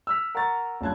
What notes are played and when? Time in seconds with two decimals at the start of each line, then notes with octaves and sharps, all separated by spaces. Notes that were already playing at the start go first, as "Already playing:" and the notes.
0.07 E6 F6 B6
0.35 A#4 F#5 A#5 C#6 A6
0.81 F#1 G2 F4 A5 F#6 G#6